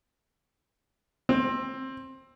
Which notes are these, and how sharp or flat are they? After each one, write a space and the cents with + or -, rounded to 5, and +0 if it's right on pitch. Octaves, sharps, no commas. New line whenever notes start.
C4 +20